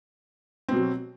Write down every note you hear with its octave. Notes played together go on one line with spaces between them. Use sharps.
B2 F#3 C4